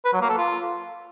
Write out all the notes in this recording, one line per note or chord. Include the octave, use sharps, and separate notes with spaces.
B4
F#3
A#3
A4
F4